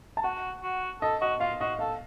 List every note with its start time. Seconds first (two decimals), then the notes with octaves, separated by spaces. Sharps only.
0.17 A5
0.24 F#4 F#5
0.63 F#4
1.01 A4 D#5
1.21 F#4 D#5
1.40 F4 F5
1.60 F#4 D#5
1.79 A4 F5